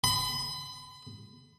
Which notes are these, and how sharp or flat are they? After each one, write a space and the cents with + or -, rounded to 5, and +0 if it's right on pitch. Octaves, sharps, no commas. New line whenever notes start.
B5 +35